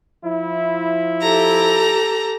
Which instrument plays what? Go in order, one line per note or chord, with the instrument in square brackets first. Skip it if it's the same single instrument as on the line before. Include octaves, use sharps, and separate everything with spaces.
[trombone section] F3 E4
[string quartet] G4 A4 A#5